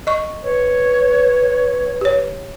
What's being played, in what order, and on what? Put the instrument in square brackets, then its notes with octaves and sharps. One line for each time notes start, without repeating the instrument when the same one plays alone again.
[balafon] D#5 C#6
[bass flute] B4 [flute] C#5
[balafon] G4 C#5